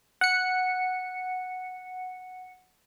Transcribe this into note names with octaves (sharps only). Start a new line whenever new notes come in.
F#5 C#7